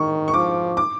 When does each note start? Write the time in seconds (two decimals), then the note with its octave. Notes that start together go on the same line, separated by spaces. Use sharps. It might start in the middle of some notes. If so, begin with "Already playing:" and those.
Already playing: D#3 C#6
0.28 C#6
0.34 F3 D6
0.77 D6